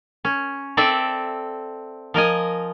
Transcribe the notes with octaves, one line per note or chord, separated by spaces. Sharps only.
C#4
C4 A4 D5 E5
F3 A#4 D#5 G#5